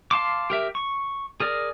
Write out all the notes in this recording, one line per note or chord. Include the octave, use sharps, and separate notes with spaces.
F5 A5 C6 D6
G4 A#4 E5
C#6
G#4 A#4 D5